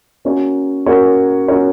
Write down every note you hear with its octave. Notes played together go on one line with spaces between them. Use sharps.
A#3 C#4 F#4 A#4 C#5
A#3 C#4 F#4 A#4 C#5
A#3 C#4 F#4 A#4 C#5